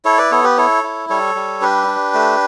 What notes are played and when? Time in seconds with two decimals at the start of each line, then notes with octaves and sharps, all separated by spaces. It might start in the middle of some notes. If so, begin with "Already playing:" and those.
0.05 E4 A4 C#5
0.18 B4 D5
0.31 B3 A4 C#5
0.44 G4 B4
0.57 E4 A4 C#5
0.84 E4
1.09 G3 A4 C#5
1.35 G3
1.62 D4 G4 B4
1.87 D4
2.14 A3